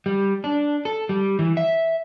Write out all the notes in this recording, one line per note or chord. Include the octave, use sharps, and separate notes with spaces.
G3
D4
A4
G3
E3
E5